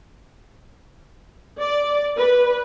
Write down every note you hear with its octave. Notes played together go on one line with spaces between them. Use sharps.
D5
B4